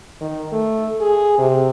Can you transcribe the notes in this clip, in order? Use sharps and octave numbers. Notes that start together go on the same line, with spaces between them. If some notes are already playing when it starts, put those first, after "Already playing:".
D#3
A3
G#4
C3